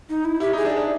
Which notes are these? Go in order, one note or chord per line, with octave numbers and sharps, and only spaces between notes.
D#4
E4
E4 G4
D#4 G#4
D4
D4